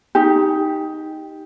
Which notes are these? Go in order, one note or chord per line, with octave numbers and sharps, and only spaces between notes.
D#4 G4